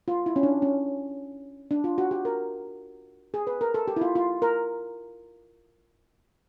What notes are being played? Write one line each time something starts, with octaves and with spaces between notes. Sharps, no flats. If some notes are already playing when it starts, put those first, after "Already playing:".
F4
E4
C#4
D4
C#4
D4
F4
F#4
G4
A#4
G#4
B4
A#4
A4
G4
E4
F4
F4
A#4